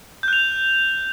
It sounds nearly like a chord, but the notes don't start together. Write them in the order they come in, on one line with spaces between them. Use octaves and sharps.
G6 F#6 F7